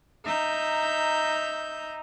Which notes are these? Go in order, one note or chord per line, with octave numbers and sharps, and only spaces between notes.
D#4 E5 A#5 G6